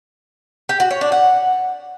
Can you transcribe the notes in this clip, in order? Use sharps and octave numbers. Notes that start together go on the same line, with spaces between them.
G4
F#4
C#5
D4
F#5